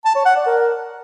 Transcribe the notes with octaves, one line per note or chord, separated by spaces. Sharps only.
A5
C#5
F#5
D5
A#4